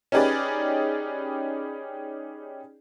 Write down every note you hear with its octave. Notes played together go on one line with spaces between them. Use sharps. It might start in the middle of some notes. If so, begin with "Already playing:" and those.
C#4 D#4 G4 G#4 B4 D5